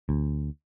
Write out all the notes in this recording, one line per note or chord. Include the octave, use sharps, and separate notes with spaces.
D2